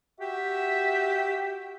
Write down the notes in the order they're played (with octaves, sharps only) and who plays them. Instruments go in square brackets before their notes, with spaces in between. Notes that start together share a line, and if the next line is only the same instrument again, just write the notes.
[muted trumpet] F#4 [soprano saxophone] G4 [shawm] E5